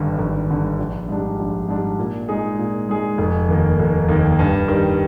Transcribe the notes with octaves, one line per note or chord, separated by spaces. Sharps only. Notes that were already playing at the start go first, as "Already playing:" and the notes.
Already playing: G#1 G2 D3
G#1
G2 D3
A#1
G#2 G3 D4
A#1
G#2 G3 D4
A#2
G#3 D#4 G#4
A#2
G#3 D#4 G#4
F1
D#2 D#3 A#3
F1
D#2 D#3 A#3
G2
D#3 G3